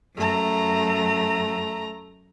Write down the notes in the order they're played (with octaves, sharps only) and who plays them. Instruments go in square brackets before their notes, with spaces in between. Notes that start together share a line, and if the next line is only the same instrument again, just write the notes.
[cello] F#2 [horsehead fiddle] A3 A#5